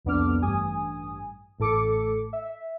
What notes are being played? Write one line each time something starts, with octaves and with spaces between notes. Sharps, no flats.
C2 F2 B3 D4 D6 F6
A1 G2 G#5 D#6
A1 A2 A4 D6 C#7
E5